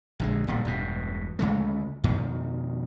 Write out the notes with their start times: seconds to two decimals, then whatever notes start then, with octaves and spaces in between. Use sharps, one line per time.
0.20 A#1 D3 G#3
0.47 D1 A#2 G3
0.65 E1 G2 B2
1.39 D2 C#3 G#3 A3
2.04 F2 B2 D#3